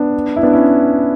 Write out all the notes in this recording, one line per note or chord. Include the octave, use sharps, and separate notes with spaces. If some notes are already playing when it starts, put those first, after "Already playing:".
Already playing: B3 D4
E4
B3 D4
C#4 E4